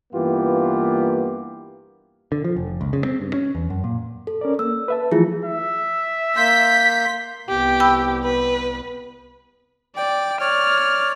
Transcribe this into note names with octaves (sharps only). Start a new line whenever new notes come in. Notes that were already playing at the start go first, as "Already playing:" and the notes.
G2 E3 A#3 B3 F4 G4
D3
F3
F1
C#2
C#3
C4
G2
C#4
E2
F#2
A#2
A4
C#4 A#4 D5
A#3 E6
B4 E5 A5
E3 F3 A3 E4 F4 G#4
E5
A#3 C6 G6 B6
C2 B3 G4
G5 B5 E6
B4
D5 G5
C#5 D5 F6